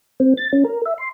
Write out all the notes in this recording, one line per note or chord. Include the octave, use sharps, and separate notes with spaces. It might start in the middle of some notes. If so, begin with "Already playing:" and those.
C4
A6
C#4
A#4
E5
C6